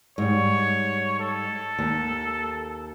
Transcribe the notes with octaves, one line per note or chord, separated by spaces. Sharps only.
G#2 G3 C#5
A4
D#2